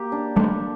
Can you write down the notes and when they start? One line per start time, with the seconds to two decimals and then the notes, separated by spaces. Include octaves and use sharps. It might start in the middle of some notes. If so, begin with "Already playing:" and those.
Already playing: A#3 G4
0.12 D4
0.36 G3 A3 D4